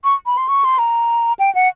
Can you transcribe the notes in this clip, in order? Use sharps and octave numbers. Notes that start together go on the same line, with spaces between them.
C#6
B5
C6
C#6
C6
A#5
G5
F#5